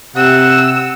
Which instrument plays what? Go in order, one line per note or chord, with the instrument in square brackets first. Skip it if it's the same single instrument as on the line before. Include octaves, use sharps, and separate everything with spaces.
[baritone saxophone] C3 [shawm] F#5 [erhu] E6